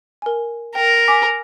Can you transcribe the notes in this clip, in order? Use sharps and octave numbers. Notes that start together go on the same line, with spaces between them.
A#4 G#5
A#4 G5
G#5 D6 B6